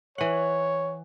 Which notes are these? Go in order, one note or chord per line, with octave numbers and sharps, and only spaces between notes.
E3 C#5 F#5